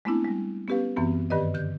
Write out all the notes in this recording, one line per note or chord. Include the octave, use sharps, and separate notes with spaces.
G#3 A3 B3 C4 D4 E4
G3 G#3
B3 C#4 G4 B4 F5
F#2 E3 B3 C4
G2 D#3 G4 B4 D5 D#5
D3 G6